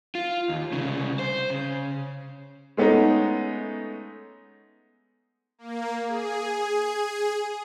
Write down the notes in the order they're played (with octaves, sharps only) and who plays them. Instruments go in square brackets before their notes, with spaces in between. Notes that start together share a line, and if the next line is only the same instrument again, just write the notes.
[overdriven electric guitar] F4
D#2
C2 C#3
C5
C#3
[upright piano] G#3 A3 B3 C#4 D#4
[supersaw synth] A#3
G#4